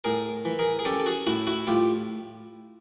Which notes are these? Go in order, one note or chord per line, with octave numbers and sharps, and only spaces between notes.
A2 G#4 A#4
E3
G#4 A#4
G#4
C#4 G4 A4
A4
F#4 G#4
A2 E4 F#4
E4 F#4
A2 F4 G4